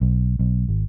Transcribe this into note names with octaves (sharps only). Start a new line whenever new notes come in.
B1
B1
G#1